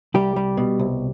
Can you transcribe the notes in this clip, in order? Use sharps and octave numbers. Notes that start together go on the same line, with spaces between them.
C2 G3 G4
G3
B2
C2